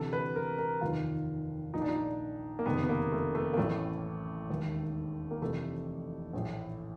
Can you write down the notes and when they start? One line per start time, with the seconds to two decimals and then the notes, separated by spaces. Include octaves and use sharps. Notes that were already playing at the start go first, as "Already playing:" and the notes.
Already playing: D2 C3 E3 A4
0.13 B4
0.36 A#4
0.58 A#4
0.81 F1 D#2 D#3 F4
1.74 A#1 A#2 D#4
1.82 D4
1.89 D#4
2.59 A#3
2.66 F#1 F2 C3 D#3 B3
2.83 B3
2.89 A#3
3.12 A3
3.35 A3
3.53 A#3
3.57 A1 A2 E3 A3
4.50 E1 D#2 D#3
5.31 A#3
5.42 F1 F2 C3 E3 A3
6.33 A#1 A2 E3